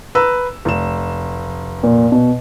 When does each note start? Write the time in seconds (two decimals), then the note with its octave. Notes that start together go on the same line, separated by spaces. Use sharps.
0.15 B4 A#5 E6
0.65 F1 E7
1.83 A#2
2.12 B2